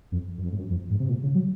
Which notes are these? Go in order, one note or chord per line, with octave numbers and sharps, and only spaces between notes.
F2
F#2
F2
G#2
F#2
F2
G#2
C3
A#2
C#3
F#3